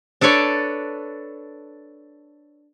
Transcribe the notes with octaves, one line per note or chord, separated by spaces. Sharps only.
D4 A4 B4 C#5 D5